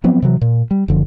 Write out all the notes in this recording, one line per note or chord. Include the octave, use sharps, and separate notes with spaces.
F3 F#3 B3 C4
C3 E3 F#3
A#2
G3
F#1 D3 F3